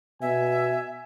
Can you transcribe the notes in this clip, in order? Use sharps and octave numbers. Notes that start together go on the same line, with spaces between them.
B2 E5 G#5